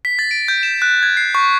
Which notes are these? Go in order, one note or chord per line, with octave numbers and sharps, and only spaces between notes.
B6
A6
D7
G6
E7
F#6
G#6
C7
C#6